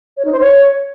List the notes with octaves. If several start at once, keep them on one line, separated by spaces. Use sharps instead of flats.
C#5
D#4
C5
C#5